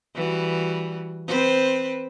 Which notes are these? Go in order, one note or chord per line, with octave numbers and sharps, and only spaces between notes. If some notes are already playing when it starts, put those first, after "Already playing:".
E3 G3 F#4
C4 B4 C5